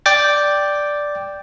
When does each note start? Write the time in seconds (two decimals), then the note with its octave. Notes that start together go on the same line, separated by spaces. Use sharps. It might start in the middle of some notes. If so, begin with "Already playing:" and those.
0.06 D5 G5 A6